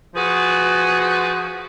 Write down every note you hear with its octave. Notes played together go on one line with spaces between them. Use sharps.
F3 F#4 G#4 B4